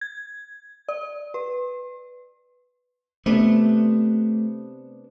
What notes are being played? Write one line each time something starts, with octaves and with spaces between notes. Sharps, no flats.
G#6
D5
B4
C3 A3 B3 D4